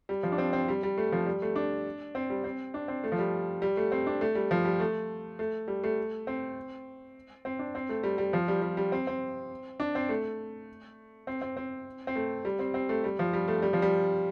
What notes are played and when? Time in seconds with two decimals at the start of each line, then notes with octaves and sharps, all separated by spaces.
0.09 G3
0.23 F3
0.32 D4
0.38 C4
0.53 C4
0.68 G3
0.83 G3
0.98 A3
1.12 F3
1.27 G3
1.42 A3
1.56 D4
2.15 C4
2.30 G3
2.44 C4
2.74 D4
2.88 C4
3.04 A3
3.12 F3
3.19 G3
3.62 G3
3.77 A3
3.92 C4
4.07 D4
4.21 A3
4.35 G3
4.51 F3
4.65 G3
4.80 A3
5.39 A3
5.68 G3
5.84 A3
6.27 C4
7.45 C4
7.59 D4
7.75 C4
7.89 A3
8.03 G3
8.18 G3
8.33 F3
8.48 G3
8.62 G3
8.77 G3
8.92 C4
9.07 C4
9.80 D4
9.95 C4
10.09 A3
11.27 C4
11.42 C4
11.57 C4
12.07 C4
12.16 A3
12.45 G3
12.59 C4
12.74 C4
12.89 A3
13.04 G3
13.19 F3
13.33 G3
13.48 A3
13.62 G3
13.73 F3
13.82 G3